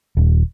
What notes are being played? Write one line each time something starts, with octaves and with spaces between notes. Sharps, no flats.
D#1